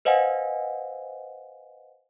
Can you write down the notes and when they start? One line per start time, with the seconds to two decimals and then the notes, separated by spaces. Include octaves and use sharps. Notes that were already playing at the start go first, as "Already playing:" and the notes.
0.05 B4 C5 D#5 F5 F#5 G#5